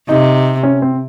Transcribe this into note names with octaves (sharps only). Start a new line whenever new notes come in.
C3 D#4
C#4
C4